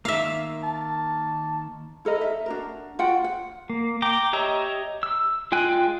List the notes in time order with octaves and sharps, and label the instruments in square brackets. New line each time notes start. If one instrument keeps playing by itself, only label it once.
[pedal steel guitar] D#3 A#3 [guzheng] E5 F5
[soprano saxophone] A5
[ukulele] E4 A4 A#4 D#5
E5
D4 F#4 A#4
F4 F#4 F#5 G5
F#5
[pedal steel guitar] A#3
G5 A#5 D6
G4 C#5 D#5 E5 A#5
E6
G#3 F4 G5 G#5 F#6